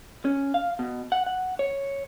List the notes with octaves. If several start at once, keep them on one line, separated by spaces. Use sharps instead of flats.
C#4
F5
B2
F#5
F#5
C#5